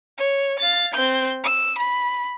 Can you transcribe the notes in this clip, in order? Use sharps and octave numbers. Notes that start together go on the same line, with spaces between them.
C#5
F5 A6
C4 G6
E6
B5